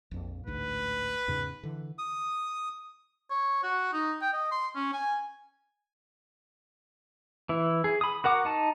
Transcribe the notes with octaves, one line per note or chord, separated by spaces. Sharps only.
A#1 F2
A1 D2 G#2 B4
E2 G#2 C#3
D3 E3
D#6
C#5
F#4
D#4
G5
D#5
C6
C#4
G#5
E3 E4
G#4
B5 D#6
F#4 A#4 F#5 D6
D#4 A5